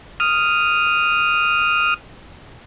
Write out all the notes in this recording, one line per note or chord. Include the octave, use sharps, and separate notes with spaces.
D#6 F6